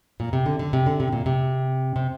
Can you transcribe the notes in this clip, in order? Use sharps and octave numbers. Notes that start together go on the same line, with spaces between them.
A#2
C3
D3
D3
C3
D3
C3
A#2
C3
C3